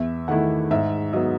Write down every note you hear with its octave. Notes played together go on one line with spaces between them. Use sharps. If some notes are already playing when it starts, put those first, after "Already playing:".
Already playing: E2 E5
D#3 A3 E4 F#5
G#2 E5
F#3 B3 D#5